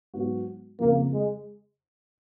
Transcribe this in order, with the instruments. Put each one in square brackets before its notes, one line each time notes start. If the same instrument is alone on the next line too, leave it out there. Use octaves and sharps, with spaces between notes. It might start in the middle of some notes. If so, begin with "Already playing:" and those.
[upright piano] G#2 F#3 B3 F#4
[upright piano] F2 C#3 F3 [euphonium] A#3
[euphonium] G#3